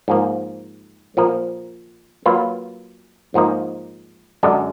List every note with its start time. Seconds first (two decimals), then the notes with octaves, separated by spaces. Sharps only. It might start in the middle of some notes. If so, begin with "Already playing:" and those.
0.08 G#2 F3 A#3
1.17 A#2 F3 A#3
2.26 F#3 A#3 F4 B4
3.34 G#2 F3 A#3 D#4
4.43 F#2 D3 G#3 D4